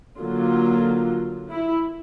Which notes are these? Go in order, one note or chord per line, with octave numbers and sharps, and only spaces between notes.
D3 F#3 A#3 F4
E4